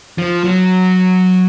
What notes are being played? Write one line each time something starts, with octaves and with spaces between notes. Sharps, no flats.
F3
F#3